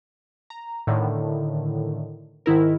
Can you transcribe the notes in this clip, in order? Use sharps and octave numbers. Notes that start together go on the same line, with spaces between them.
A#5
A2 D3 D#3
G#2 D#3 E4 A#4